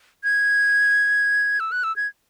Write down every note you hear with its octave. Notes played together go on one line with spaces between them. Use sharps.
G#6
E6
F#6
E6
G#6